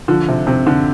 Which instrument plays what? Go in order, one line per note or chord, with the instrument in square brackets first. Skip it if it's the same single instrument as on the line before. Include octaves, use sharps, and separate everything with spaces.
[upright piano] D3 [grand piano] F3
[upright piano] C3
[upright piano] C3 [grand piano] C4
[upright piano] D3